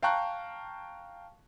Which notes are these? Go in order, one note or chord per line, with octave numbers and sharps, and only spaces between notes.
F5 G5 A5 A#5 C#6 F#6